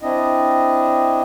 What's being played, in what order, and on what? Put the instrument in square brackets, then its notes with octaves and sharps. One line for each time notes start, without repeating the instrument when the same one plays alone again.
[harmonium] C4 D4 E4 D#5